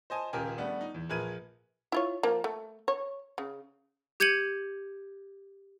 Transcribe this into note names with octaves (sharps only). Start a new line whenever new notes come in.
C5 D#5 G#5 A5
D#1 C#2 G4 A#4 G#5
G3 A3 B3 D4
D#4
E2
A#1 G#4 A#4 B4 G#6 D#7
E4 F4 C#5
F3 A#3
A3
C#5
C#3
G4 G6 G#6 C#7 D#7 F#7